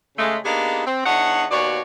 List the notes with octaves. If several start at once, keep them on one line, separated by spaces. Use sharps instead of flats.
C#3 G#3 A3
A#3 B3 D4 D#4 G4 G#4
C4
E2 D4 D#4 C#5 F#5
D#2 B2 F#4 C#5 D5